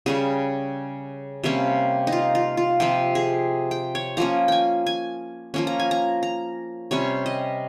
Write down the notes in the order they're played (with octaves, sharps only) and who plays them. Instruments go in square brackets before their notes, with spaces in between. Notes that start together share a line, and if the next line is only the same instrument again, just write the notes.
[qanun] C#3 G3 C#4 G#4
C3 G3 A#3 C#4
D#4
F4
F4
F4
C3 F3 C4 G4
G#4
G5
C#5
F3 A#3 C#4 A#5
G5 G#5
G#5
F3 A#3 C#4
A#5
G#5
A#5
A#5
C3 G3 C#4 C#5
D#5